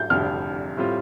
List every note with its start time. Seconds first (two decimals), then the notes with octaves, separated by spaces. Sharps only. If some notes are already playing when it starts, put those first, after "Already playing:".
Already playing: G6
0.10 F1 F2 D3 G3 F6
0.77 A2 G3 C4 F4